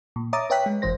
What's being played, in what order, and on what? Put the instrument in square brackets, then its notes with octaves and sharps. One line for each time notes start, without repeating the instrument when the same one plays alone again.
[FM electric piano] A#2
C#5 E5 A#5 D6 D#6 A6
B4 C#5 E5 G5 F#6 B6
G#3
G1 F#2 E3 C5 A#6